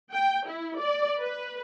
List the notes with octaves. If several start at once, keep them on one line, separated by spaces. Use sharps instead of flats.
G5
E4
D5
B4